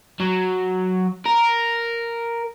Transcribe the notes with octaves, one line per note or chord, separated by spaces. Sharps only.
F#3
A#4